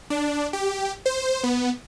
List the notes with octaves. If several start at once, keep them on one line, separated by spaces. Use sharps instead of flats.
D4
G4
C5
B3